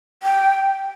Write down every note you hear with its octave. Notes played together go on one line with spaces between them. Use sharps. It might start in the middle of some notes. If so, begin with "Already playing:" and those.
G5